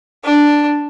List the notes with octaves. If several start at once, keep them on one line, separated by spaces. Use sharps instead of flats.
D4